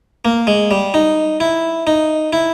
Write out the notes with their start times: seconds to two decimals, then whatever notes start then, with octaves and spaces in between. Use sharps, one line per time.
0.25 A#3
0.47 G#3
0.71 G3
0.94 D#4
1.40 E4
1.87 D#4
2.33 E4